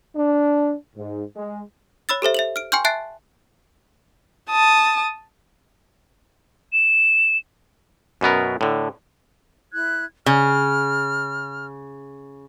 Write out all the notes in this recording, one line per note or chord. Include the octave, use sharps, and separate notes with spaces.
D4
G#2
G#3
C#5 B5 E6 A6
G4 A4 C5 E5
E5 F7 F#7
F6 D7
G5 G#5 C6 C#6 F6 G6
E5 A5 F#6 A6 C7 D7
A5 D#6
E7
F#2 B2 B3 A#4
A2 D3
E4 F#6 G#6
C#3 F6